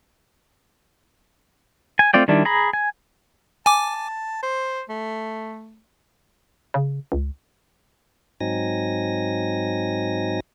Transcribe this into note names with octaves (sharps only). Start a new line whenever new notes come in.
G#5
A3 C4 F4 D5 G5
D#3 G3 D4 E4
G#4 A#5 B5
G#5
G#5 A5 D6
C5
A3
C#3
C#2
G#2 F#3 C4 D#4 G#5 A#6